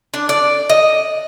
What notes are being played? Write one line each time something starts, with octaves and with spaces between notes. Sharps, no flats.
D4
D5
D#5